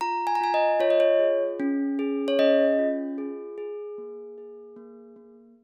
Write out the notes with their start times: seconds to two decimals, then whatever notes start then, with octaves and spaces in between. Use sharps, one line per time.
0.01 F4 A#5
0.27 G#5
0.35 A#5
0.41 F4 G#5
0.54 D#5
0.80 F4 C#5
0.90 D#5
1.00 C#5
1.19 G#4
1.60 C#4
1.99 G#4
2.28 C#5
2.39 C#4 D#5
2.79 F4
3.18 G#4
3.58 G#4
3.98 A#3
4.38 G#4
4.76 A#3
5.16 A#3